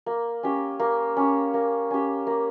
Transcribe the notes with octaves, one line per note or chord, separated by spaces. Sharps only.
A#3
C#4 G4
A#3
C#4 G4
A#3
C#4 G4
A#3